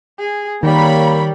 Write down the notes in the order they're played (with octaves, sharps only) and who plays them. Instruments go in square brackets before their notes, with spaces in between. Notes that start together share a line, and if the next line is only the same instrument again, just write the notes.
[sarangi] G#4
[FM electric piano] D#3 [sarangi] G3 [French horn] A#3 [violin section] A#4 C#5 B5